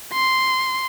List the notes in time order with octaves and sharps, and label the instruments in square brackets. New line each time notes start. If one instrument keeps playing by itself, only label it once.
[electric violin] C6